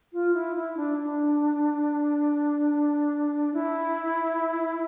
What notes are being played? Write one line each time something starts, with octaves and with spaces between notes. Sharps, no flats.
F4
E4
E4
D4
D4
E4